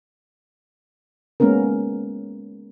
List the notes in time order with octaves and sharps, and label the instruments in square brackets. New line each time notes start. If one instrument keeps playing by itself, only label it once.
[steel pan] G#3 A#3 B3 C#4 A#4